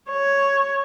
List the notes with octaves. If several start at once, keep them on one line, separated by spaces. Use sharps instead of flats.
C#5